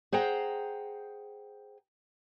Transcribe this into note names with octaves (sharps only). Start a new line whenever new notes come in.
G#4 C5 F#5 G5 A#5